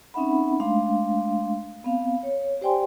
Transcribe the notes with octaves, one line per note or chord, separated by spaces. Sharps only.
C4 C#4 D#4 E5 F#5 B5
G#3 A3 D4 F5 C6
B3 C4 F5
C#5
G4 C5 D5 G5 G#5 C6